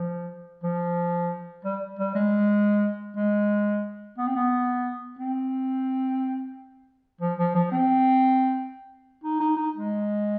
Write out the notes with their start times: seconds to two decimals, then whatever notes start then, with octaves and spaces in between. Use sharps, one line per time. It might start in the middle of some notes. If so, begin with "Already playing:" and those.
Already playing: F3
0.64 F3
1.65 G3
1.99 G3
2.15 G#3
3.16 G#3
4.18 B3
4.27 C4
4.36 B3
5.19 C4
7.21 F3
7.39 F3
7.55 F3
7.72 C4
9.24 D#4
9.40 D#4
9.57 D#4
9.75 G#3